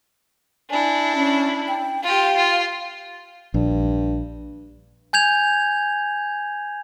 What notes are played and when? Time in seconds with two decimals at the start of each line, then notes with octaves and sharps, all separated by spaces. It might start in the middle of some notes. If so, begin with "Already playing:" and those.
0.70 D4 E4 G#5
1.15 C#4
1.68 G5
2.04 F4 G4 F5
2.36 F4
3.54 A#1 G2
5.13 G#5 G6 G#6 F7